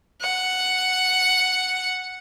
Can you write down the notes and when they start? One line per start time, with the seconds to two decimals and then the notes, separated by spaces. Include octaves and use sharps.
0.22 F#5